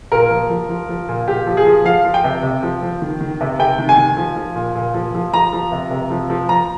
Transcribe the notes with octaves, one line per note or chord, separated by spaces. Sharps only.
A#2 A#4
F3
F3
F3
F3
A#2
A#2 G4
F3
G#4
F3
F3 F5
F3
G5
C3
C3
F3
F3
D#3
D#3
C3
C3 G5
D#3
G#5
D#3
F3
F3
A#2
A#2
F3
F3
F3 A#5
F3
C3
C3
F3
F3
F3 A#5